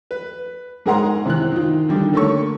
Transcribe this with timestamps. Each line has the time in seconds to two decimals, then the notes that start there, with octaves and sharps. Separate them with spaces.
0.11 B4
0.86 G#2 G#4 A#4 F#5 A#5 C6
1.25 C3 E3 F#6
1.52 D#3 F4
1.88 D3 D#3 G3 D4
2.13 D3 A3 A#3 A4 C#5 C#6